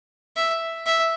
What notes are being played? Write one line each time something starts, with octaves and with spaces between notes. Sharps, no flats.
E5
E5